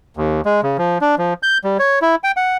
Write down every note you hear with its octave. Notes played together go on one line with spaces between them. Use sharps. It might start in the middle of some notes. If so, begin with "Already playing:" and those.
D#2
G#3
C#3
F3
D4
F3
G6
G3
C#5
E4
G5
F#5